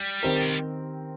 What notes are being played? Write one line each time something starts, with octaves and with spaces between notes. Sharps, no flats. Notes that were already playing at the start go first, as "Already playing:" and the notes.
Already playing: G3
D#3 C4 G4 A#4
C3